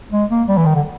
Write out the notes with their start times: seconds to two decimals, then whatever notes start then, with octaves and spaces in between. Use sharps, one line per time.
0.12 G#3
0.30 A#3
0.48 G3
0.57 E3
0.66 D#3
0.75 D3